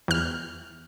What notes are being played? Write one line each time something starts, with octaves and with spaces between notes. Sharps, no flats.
E2 F6